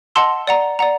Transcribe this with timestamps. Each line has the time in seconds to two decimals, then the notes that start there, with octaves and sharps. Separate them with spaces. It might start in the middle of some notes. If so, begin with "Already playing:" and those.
0.15 D#5 F#5 A5 C6 E6
0.47 D5 F#5 A#5
0.79 D5 F#5 A#5